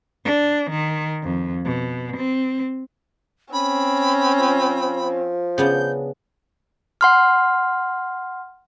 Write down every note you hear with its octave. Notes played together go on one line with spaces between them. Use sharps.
D4
D#3
F2
B2
C4
C4 C#4 B5
F3
C#3 B3 D4 G6
F#5 C6 F6